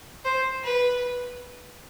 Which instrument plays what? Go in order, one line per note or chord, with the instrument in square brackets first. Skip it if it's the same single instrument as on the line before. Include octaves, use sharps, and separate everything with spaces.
[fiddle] C5
B4